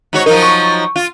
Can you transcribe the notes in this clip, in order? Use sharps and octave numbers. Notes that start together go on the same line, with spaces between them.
G#2 F#4 C#5
F3 F#3 D#4 A#4
C#6
F4